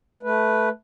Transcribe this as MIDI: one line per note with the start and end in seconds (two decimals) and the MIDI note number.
0.23 0.69 57
0.23 0.69 71